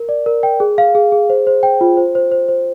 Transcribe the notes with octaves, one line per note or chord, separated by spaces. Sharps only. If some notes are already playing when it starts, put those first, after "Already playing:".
Already playing: A#4
D5
A#4
G5
G#4
F5
G#4
G#4
C5
C5
G5
F4
C5
C5
C5
C5